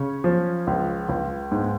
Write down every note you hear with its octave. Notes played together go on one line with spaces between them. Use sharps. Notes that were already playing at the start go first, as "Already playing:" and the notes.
Already playing: C#3 C#4 C#5
F3
C#2
C#2
G#2